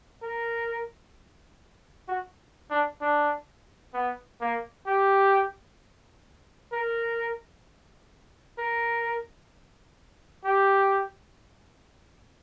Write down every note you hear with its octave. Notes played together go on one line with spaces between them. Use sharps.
A#4
F#4
D4
D4
B3
A#3
G4
A#4
A#4
G4